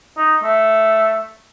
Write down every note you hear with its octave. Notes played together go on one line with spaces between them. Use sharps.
D#4
A3